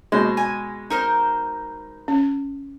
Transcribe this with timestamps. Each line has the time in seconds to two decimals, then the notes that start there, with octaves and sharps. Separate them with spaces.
0.12 B2 G#3 C5
0.37 G#5
0.90 D#4 A#4 C5
2.08 C#4